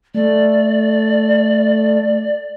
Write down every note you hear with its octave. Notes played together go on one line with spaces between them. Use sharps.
A3 D5